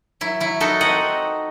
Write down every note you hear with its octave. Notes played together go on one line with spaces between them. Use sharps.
F#3 E4
F#3 E4
D#4 F#4 A4
C4 D#5 F#5